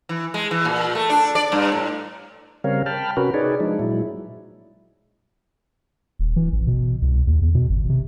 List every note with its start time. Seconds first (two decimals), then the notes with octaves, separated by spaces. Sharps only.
0.09 E3
0.34 G#3
0.51 E3
0.65 A#2
0.95 A3
1.09 D4
1.35 D5
1.52 G2
1.72 A2
2.64 C#3 G3 C4 A#4 C#5 F5
2.86 G5 A5 B5 F6
3.17 C3 C#4 F#4 A#4 B4
3.34 D#4 G#4 B4 C#5 D5
3.60 F3 G#3 D4 D#4
3.79 A#2 F#3 G#3 E4
6.19 D#1
6.36 E3
6.53 A1
6.67 B2
7.02 C2
7.27 D#2
7.42 E2
7.55 B2
7.70 G#1
7.89 C3